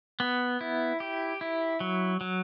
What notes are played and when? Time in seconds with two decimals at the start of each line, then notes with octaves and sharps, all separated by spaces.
0.20 B3
0.61 E4
1.00 G4
1.41 E4
1.80 F#3
2.21 F#3